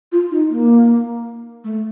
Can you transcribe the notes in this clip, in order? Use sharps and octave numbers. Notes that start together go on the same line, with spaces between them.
F4
D#4
A#3
A3